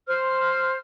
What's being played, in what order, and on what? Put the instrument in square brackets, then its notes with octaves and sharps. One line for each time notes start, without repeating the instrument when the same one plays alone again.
[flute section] C5 F6